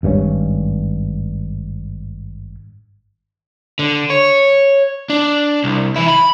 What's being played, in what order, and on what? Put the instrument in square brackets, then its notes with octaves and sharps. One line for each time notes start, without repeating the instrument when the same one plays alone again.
[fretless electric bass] G#1 G2 D#3 C#4
[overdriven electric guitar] D3
C#5
D4
C2
E3 E4
B5